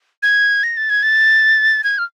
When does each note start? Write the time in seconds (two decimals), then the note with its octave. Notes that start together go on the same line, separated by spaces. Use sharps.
0.23 G#6
0.63 A#6
0.77 A6
0.90 G#6
1.03 A6
1.84 G#6
1.98 F6